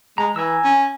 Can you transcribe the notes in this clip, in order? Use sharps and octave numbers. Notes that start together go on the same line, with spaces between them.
G#3 A#5
E3 G#5 A#5 E6
C#4